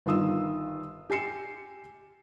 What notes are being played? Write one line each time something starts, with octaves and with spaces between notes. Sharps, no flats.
G1 D#3 F4 D#6 E6
G4 G#5 C7 C#7 E7